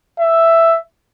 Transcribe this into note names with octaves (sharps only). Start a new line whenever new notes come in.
E5